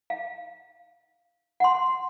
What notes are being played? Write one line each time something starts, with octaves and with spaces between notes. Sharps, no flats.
F5
F#5 C6